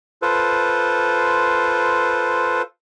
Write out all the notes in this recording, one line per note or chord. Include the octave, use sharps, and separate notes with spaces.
F4 A4 B4 C5